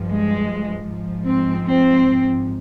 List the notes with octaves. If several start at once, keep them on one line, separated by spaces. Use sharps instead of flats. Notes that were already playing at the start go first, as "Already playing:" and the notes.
Already playing: G2 F3
G#3
G#2 F3
C4
C4